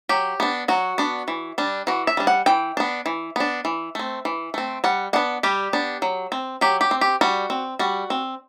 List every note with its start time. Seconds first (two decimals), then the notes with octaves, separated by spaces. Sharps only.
0.09 F#3 G4
0.40 B3 D4
0.68 F#3 F#4
0.98 B3 D4
1.28 E3
1.58 G3 D4
1.87 E3 F#4
2.07 E5
2.17 G3 D4
2.27 F#5
2.46 E3 G5
2.77 B3 D4
3.06 E3
3.36 B3 D4
3.65 E3
3.95 A3 C4
4.25 E3
4.54 A3 C4
4.84 G3 F#5
5.13 B3 D4 F#5
5.43 G3 G4
5.73 B3 D4
6.02 F#3
6.32 C4
6.61 F#3 G4
6.81 G4
6.91 C4
7.01 G4
7.21 G3 F#4
7.50 C4
7.79 G3 F#4
8.10 C4